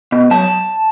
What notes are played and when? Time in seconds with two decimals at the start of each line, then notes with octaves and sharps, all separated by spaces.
0.12 B2
0.31 F#3 A5